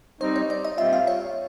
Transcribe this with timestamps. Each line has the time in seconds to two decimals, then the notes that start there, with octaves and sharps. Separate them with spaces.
0.21 G3 C4 D#4 C5
0.36 C#5
0.50 D5
0.65 D#5
0.78 A#2 G3 C4 F4 E5
0.93 F5
1.07 C#5